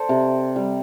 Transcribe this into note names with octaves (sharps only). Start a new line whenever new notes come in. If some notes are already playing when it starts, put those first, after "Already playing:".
Already playing: A4 C5 D5
C3
G3